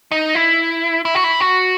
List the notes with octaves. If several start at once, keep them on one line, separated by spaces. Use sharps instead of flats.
D#4
E4
E4
F#4
E4
F#4